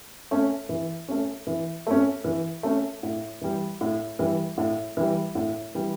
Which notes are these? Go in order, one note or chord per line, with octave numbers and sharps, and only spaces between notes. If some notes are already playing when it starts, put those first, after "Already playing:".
A3 C#4
E3
A3 C#4
E3
A3 C#4
E3
A3 C#4
A2
E3 G3
A2
E3 G3
A2
E3 G3
A2
E3 G3